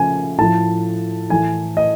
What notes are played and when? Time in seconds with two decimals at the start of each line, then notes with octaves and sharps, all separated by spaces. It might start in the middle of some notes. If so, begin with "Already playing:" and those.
Already playing: C#3 F3 A3 G#5
0.38 A2 F3 A3 A5
1.30 A2 E3 A3 G#5
1.77 D#5